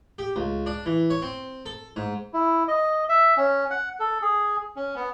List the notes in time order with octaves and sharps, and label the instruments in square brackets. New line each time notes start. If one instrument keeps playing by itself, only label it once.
[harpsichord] G4
C#2
D4
E3
C#5
C4
A4
G#2
[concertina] E4
D#5
E5
C#4
F#5
A4
G#4
C#4
B3